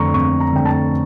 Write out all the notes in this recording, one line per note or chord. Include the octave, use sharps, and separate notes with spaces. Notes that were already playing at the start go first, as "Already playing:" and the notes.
Already playing: F2 D3 A3 A#5 C#6
F2 C#6
A#5
D3 A3 G5
A5